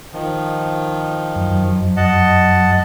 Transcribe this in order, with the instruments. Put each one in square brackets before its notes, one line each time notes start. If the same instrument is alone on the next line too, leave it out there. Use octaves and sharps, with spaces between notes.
[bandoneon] D#3 F3
[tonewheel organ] F#2
[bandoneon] D#5 F#5 A5